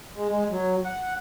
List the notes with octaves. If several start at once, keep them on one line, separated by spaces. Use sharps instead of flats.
G#3
G#3
F#3
F#5